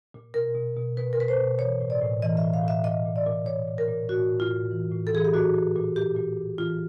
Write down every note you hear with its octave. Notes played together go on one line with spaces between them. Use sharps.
A#2
B2 A#4
B2
B2
B2 B4
A#4
B2 B4
C5
B2
E3 C#5
A2
D5
A2
E3 D#5
E5
A2
F5
A2 E5
A#2 D#5
A#2
D5
A#2
A#2 C#5
A#2
A#4
A#2
A2 F#4
A2
F4
A2
E3
A2
A4
E3 G#4
G4
A#2 F#4
A#2
A#2
A#2 G4
A#2
A#2
E3 F4